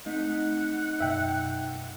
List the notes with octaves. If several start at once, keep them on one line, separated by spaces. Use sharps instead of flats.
A3 C4 D#4 F#5 B6
F#2 B2 E5 G5